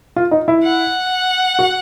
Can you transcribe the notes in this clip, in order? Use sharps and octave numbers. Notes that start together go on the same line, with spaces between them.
F4
D#4
E4
F#5
F#4